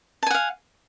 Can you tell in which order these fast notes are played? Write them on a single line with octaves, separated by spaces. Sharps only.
A5 G#5 F#5 F5